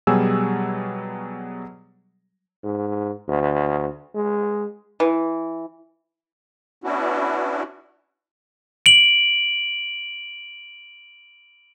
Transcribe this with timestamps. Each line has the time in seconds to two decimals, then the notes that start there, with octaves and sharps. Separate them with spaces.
0.07 B2 F#3 G3 G#4 G#5 E6
2.64 G#2
3.28 D2
4.15 G#3
5.00 E3
6.84 B3 C#4 D4 E4 F#4
8.86 D7 F#7